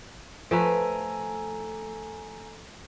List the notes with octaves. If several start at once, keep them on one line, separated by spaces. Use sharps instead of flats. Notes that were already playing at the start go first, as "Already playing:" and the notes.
F3 A3 A4 B4 G#5 A#5